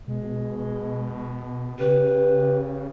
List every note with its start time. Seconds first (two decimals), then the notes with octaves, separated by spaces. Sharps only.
0.07 B2 G#3
1.79 C#3 G4 B4